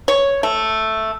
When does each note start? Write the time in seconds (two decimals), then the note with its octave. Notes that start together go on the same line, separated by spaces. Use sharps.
0.08 C#5
0.43 A3